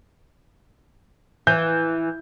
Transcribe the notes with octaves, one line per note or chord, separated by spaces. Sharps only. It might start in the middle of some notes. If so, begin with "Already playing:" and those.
E3 G6